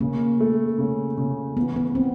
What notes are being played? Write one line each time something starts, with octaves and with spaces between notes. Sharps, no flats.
C#3 A#3
A3
C#3
C#3
E3 B3
B3
C4